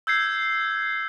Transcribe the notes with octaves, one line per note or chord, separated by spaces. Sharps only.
E6 G6 G#6 C7